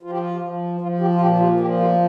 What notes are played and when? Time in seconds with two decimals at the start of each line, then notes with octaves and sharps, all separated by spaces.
0.03 F3 F4
0.10 G4
0.18 F4
0.42 F3
0.81 F3 F4
1.00 G4
1.15 F4
1.21 A#2 G4
1.40 F4
1.60 F3 G4
1.80 F4